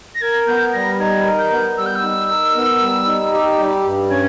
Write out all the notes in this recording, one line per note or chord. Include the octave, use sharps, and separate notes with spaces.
A#6
A#4 G#6
B3 G6
G3 A#6
D#4 G#6
A#4
G6
B3
G3 E6
G6
E6
D#4
A#4
B3
G3
D#4
G4
G3
G2
C#4 G#6